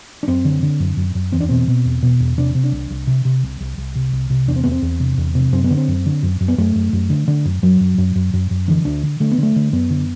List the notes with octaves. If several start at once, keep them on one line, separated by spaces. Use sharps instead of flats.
D4
F#2 C4
D3
D3
F#2
F#2
F#2
E2 C4
D4
B2 C4
B2
E2
B2
E2
C3 D4
C3
D4
C2
C2
C3
C3
C2
C2
C2
C3
C2
C3
E2 D4
C4
E2 B3
C4
E2
C3
E2
C3
F#2 C4
B3
D3
C4
F#2
D3
F#2
F#2
B3
F#2 A3
F#2
F#2
D3
D3
F#2
F#2 F#3
F#2
F#2
F#2
F#2
F#2
D3 E3
D2 D4
D3
D3 A3
B3
D3 A3
D3
F#2 B3
D3